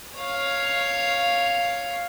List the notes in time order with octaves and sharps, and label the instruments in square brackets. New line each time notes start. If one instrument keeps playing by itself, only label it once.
[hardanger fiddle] C#5 F5